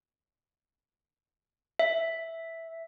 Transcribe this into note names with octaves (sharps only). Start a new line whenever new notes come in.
E5